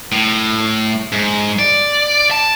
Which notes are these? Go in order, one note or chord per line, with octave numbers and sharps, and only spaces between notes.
A2
G#2
D5
A5